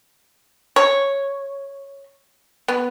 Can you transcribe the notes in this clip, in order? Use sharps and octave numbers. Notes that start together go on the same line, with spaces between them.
C#5
B3